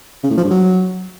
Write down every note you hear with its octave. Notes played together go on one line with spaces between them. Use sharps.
C#3
A2
F3
G2
F#3